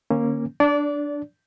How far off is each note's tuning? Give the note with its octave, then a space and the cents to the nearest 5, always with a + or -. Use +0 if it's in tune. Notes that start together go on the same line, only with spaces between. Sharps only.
D3 +15 A#3 +0 C#4 -20
D4 +0 D5 -25